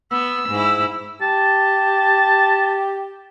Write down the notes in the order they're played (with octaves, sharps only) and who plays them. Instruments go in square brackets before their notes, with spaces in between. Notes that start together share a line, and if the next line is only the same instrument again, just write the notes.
[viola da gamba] B3 [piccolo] E6
[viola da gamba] G#2 E4
[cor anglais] G4 [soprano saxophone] A5